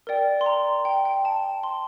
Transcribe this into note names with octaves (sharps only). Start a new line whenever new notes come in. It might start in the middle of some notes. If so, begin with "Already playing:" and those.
A#4 D5 G5
C6
A#5
G5
G5
A5
C6